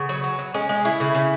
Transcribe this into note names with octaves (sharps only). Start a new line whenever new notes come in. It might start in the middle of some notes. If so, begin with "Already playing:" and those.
Already playing: C#3 B3
F#3
F#3
F#3
G#3 C#4
G#3
C#3 E4
C#3
C#3